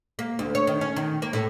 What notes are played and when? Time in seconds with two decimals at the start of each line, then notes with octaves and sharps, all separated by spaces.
0.19 A#3
0.39 D2
0.55 C#5
0.67 D#3
0.81 C#4
0.96 D#3
1.22 A#3
1.33 A2